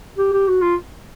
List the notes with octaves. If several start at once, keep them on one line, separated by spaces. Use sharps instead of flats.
G4
G4
F#4
F4